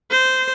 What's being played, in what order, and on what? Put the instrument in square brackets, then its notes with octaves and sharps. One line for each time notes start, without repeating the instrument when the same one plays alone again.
[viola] C5